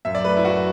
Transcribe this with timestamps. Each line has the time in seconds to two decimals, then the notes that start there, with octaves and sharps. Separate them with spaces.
0.05 F#2 E5
0.15 D5
0.24 A3 B4
0.37 E4
0.44 F#2 F#4